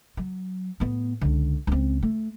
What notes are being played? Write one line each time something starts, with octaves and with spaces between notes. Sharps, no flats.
F#3
A2 B3
C#2 D3
C#2 C4
A3